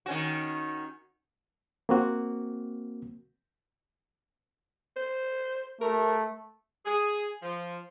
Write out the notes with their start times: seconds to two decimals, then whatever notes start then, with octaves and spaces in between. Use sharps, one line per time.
0.06 D#3 C#4 F#4
1.89 A#3 C4 F#4
4.96 C5
5.81 A3 A#4
6.86 G#4
7.42 F3